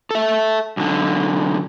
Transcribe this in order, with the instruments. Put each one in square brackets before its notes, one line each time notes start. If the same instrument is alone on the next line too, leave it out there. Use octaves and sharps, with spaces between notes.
[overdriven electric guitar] A4 E5
B1 D3